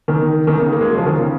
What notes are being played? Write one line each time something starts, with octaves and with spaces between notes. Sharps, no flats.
D#3
D#3
C#3
A#3
G#3
F#3
F3
D#3
C#3